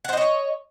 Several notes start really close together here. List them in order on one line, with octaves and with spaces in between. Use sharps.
F#5 C5 D#5 C#5